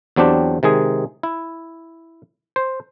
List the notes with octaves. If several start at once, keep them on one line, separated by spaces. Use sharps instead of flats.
E2 F#3 C4 D4 G4
C3 D#3 G#3 G#4
E4
C5